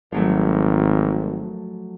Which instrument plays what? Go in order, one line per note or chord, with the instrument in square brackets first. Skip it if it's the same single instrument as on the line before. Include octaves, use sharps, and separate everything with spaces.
[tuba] G#1 [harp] F3 F#3 A3